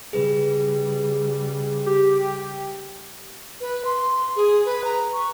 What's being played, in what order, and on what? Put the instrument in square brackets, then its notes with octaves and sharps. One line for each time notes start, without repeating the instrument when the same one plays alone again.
[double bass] C#3 G3 [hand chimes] G#4 B4
[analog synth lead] G4
[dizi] B4
C6
G#4
B4
A#5
C#6